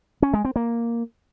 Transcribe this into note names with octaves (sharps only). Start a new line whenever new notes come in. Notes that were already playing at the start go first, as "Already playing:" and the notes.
C#4
G#3
C4
A#3